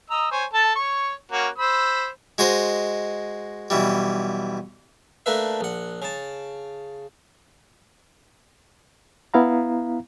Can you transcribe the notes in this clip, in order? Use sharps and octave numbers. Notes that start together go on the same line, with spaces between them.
D#5 A#5 E6
C5 C#5 G#5
A4 A5
C#5 C#6
A#3 C#4 F#4
C5 B5 E6
G#3 F#4 C5 D#5
B1 E3 G3
A3 A#3 D4 B4 E5
A#1 F#5
C#3 A5
B3 E4 F5 A#5